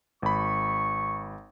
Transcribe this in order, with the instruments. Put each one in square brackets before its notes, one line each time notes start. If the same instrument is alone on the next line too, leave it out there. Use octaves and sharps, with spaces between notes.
[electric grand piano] G#1 B5 [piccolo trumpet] C#6